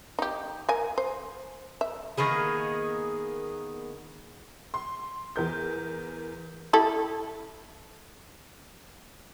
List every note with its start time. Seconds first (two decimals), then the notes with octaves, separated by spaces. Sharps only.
0.19 D#4 G4
0.69 A#4 G#5
0.98 C5
1.81 E5
2.17 D#3 A#3 B3 G#4
4.74 C6
5.36 E2 A#4 G6
6.73 E4 G4 A4